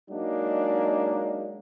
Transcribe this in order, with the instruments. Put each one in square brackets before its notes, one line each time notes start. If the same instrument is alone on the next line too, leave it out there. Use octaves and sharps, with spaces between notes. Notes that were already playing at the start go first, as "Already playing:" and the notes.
[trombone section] F#3 G#3 A#3 D4 D#4